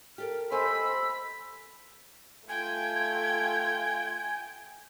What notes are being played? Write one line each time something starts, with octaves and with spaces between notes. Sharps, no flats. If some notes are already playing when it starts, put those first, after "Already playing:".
G4 A4 A#4 F6
G4 A4 C5 D#5 G#5 B5 E6
A3 F4 G5 G#5 G#6